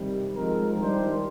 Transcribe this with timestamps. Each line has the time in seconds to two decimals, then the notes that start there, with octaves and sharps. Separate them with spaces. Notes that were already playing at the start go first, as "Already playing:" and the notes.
Already playing: C3 D#3 G3
0.34 F3 G#3 C4 D#4 A#4
0.77 D#3 G3 D4 G4 C5